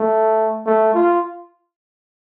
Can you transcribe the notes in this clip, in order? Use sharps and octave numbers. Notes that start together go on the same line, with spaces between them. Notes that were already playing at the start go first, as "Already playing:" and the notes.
Already playing: A3
A3
F4